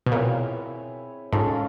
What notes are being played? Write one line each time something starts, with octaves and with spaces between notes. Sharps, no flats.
B2
A#2 C4 E4 G#4 C#5
G#2 C#4 F4 A4